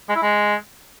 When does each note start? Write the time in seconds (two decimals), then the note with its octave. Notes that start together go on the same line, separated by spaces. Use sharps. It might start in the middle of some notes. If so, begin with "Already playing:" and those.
0.09 G#3
0.16 E4
0.22 G#3